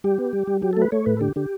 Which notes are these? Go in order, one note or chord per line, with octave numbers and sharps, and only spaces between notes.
G3 G4
B3
G3
G3
F#3 G4
A4
A3 B4
A3 C#5
A2 B4
A4
D3 G4
D3 G4